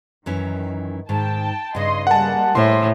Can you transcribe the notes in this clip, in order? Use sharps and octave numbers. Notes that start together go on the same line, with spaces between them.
F#2 D#3 E3 C#4
G#2 D#3 G5 A5
G2 C#3 D#4 D#5 C6
G3 G#3 A#3 F#5 A5
A2 C5 E5 C6